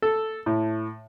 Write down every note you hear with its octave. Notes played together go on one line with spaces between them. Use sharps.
A4
A2